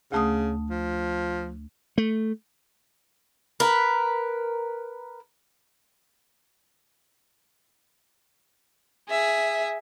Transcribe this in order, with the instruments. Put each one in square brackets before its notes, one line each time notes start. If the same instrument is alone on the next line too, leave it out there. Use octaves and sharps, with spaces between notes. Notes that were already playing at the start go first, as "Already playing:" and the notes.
[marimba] D2 A3 D#6 [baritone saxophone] C#3
[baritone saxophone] F3
[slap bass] A3
[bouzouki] A#4 B4
[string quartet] G#4 E5